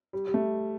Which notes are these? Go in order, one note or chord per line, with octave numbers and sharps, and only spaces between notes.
G3
G3
A3